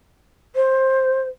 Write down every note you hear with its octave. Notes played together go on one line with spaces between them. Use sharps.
C5